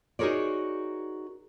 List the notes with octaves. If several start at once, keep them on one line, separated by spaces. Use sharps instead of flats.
D#4 F#4 G#4 A#4 C#5 D5